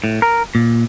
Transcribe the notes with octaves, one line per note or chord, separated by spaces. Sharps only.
A2
A#4
A#2